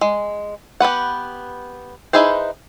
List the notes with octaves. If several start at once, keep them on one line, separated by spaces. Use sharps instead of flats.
G#3
B3 G4 B4 F#5
D#4 E4 G#4 B4 C5